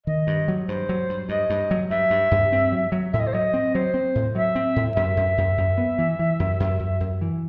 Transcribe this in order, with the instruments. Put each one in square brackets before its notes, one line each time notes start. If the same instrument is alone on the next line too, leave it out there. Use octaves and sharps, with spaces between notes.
[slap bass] D#3 [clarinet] D#5
[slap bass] G2
F#3
[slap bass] G2 [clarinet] C5
[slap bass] F#3
G2
[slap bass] G2 [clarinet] D#5
[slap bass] G2
F#3
[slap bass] G2 [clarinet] E5
[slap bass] G2
G2
C4
F#3
F#3
[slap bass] A2 [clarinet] E5
[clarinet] D#5
C5
[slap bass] F#3 [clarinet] D#5
[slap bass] C4
[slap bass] F#3 [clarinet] C5
[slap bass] C4
A2
[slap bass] F#3 [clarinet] E5
[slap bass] C4
A2
[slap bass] F#2 [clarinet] E5
[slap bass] F#2
F#2
F#2
B3
E3
E3
F#2
F#2
F#2
F#2
E3